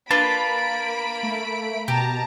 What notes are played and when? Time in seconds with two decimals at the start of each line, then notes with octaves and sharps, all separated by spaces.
0.11 A#3 D4 F4 B4 A5 B5 D7
1.23 A3
1.88 B2 G4 A5 A#5